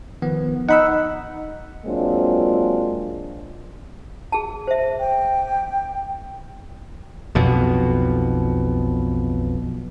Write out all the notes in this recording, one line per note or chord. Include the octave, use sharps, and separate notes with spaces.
D#3 F3 B3
D#4 F#5 B5 E6
F#3 G#3 A#3 C4 D4 F4
G#4 A5
C5 E5
G5
B1 F2 B2